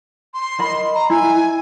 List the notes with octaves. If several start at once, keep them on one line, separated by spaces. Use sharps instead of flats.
C6
A#4 D#5 B5
A#5
E4 G#5